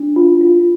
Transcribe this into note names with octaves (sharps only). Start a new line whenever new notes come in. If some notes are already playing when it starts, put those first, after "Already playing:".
Already playing: D4
F4
F4